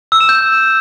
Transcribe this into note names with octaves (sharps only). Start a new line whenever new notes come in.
E6
E7
G6